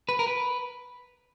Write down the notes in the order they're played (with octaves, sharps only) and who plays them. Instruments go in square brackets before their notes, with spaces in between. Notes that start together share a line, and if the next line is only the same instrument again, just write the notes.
[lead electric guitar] B4
A#4
B4